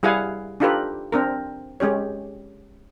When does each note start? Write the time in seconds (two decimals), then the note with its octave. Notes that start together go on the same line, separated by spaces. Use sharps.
0.03 G3 E4 G#4 F5 F#5 G#5
0.60 D4 D#4 F4 G4 A4 B4
1.12 C4 D4 A#4
1.80 G#3 C#4 G4 C#5